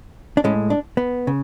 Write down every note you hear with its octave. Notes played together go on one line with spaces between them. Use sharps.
D4
A2 G#3 C#4
D4
B3
C#3